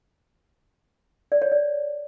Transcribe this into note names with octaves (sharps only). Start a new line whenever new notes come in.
D5
C#5
D5